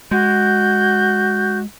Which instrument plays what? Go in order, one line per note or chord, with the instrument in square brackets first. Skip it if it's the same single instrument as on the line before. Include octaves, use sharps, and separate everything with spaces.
[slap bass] G#3 [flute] F#4 [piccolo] G6